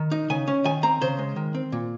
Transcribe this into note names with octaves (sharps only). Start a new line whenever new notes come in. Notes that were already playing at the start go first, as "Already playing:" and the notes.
Already playing: D#3
D#4
C#3 G#5
C#4
D#3 G#5
C4 A#5
C#3 C5
G#3
D#3
C4
A#2